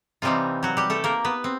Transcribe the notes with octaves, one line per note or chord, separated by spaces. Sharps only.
C3 E3 G3 C4 D#4 F4
F#3 F#4
G3 G4
A3 A4
A#3 A#4
B3 B4
C4